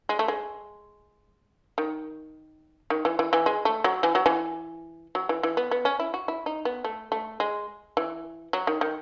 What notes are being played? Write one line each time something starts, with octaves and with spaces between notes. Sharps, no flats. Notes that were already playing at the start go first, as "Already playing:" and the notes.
G#3
A3
G#3
D#3
D#3
E3
E3
E3
G#3
A3
F#3
E3
F#3
E3
F#3
E3
E3
B3
B3
C#4
E4
F#4
E4
D#4
B3
A3
A3
G#3
E3
F#3
D#3
D#3